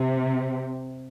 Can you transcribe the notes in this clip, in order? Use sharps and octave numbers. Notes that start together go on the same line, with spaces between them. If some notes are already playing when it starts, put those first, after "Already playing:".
Already playing: C3